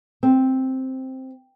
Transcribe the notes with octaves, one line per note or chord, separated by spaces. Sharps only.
C4